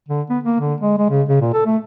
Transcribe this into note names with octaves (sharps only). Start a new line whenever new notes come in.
D3
B3
A#3
D3
G#3
G#3
C#3
C#3
A#2
A4
A3